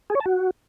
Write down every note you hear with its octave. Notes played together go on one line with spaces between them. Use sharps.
G#4
C#5
A5
F#4